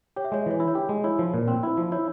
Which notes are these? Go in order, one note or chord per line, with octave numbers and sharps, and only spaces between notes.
G4 C#5
E5
G#3 C#5
E5
E3 C#5
E4 E5
C#5
G4
G#3
E4 C#5
F3
A#2
C4 C5
E4
F3
E4 C#5